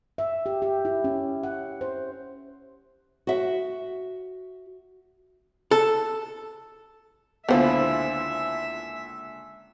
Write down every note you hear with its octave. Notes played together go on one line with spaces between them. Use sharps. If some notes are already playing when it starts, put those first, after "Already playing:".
E5
G4
G4
E4
C#4
F#5
C5
F#4 E5
A4
C#2 A#2 D3 B3 E4 F4 C5 E5